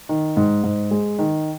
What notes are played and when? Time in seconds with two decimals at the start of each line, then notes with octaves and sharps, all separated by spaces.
0.09 D#3
0.37 G#2
0.64 G#2
0.91 G#3
1.19 D#3